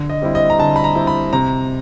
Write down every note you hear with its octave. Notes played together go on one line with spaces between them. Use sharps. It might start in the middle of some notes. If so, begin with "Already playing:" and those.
Already playing: D3
D#5
G3 C4 E4
D#5
A#5
D3 A5
B5
A#5
G3 C4 E4
B5
C3 A#5